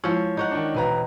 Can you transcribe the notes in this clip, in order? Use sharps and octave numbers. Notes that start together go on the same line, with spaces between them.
F3 G#3 E4 F4 C#5
D#4 C#5 F#5
D#3 D4
E1 B4 C5 F5 A#5